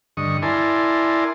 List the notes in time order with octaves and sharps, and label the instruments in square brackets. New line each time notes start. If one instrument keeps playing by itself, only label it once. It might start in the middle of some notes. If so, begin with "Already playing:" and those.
[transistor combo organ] G2 D3 D#5 C#6
E4 A#4 D5 G#5 A5 C6